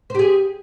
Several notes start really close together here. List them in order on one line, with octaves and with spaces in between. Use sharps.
C5 G4 G#4